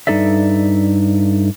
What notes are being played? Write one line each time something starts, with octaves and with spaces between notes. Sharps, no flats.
G2 D#4 A4 D5 E5